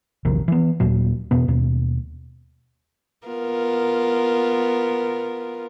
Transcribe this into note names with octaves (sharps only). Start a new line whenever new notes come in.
A#1 E2 C3 D#3
E3 B3
D#2 A#2 F#3
E2 B2 B3
D#2 B2
B3 F4 A#4